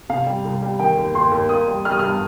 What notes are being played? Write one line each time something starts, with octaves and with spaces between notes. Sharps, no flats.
C3 F5
G3
C2
G3
D#3 G5
D#2
D#2 C6
D#2
A#3 D#6
G3
G3 F6
D#6
F6
G2